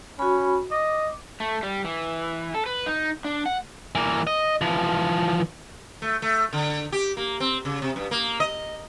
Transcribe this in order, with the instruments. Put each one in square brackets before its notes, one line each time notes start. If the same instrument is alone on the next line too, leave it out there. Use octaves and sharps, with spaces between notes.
[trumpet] C#4 [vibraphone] F#4 B5
[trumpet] D#5 [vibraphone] D6
[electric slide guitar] A3
G3
E3
A4
B4
D#4
D4
F#5
[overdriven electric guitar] E3 A#3
D#5
E3 F3
[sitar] A3
A3
D3
G4
A#3
C4
C#3
C3
G2
A#3
D#5